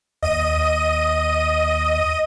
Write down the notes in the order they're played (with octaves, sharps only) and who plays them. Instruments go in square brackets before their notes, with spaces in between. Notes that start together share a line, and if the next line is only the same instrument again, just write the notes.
[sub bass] D#2 [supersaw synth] D#5 D#7